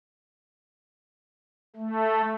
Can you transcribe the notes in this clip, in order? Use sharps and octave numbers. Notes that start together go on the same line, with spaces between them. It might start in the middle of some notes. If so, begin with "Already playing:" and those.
A3